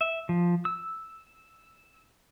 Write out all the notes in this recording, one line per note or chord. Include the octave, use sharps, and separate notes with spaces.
E5
F3
E6